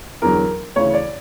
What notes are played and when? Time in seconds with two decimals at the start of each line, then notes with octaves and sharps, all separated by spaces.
0.22 E2 D3 F#3 A#4
0.76 D2 C#3 E3 C#5
0.94 D5